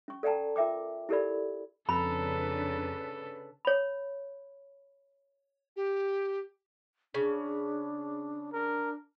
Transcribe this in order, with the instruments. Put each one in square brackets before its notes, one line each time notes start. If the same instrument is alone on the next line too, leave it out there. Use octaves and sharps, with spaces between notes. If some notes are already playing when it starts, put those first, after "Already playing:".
[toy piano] C#4 C#6
A4 D5 F#5 G5 A5 A#5
F4 A#4 E5 G5 D6
E4 G4 A4 A#4 D5 B5
[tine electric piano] F2 A#5 [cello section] C#3 D4 B4 [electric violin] A4 [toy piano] B5
[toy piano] C#5 B5
[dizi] G4
[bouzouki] C#3 [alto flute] D4
[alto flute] D4 [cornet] A#4